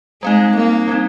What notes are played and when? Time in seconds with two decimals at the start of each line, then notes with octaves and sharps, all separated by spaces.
0.23 G3 G#3 C4 D#4
0.56 A#3
0.88 G3 C4 D#4